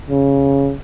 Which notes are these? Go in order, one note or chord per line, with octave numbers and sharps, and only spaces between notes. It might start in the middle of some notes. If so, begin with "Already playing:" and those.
C#3